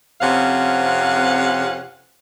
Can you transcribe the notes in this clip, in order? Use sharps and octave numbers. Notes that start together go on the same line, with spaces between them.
F2 C3 C#4 F5 F#5